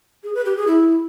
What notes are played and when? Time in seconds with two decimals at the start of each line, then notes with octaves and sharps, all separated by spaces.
0.24 G#4
0.35 B4
0.46 G4
0.56 G#4
0.67 E4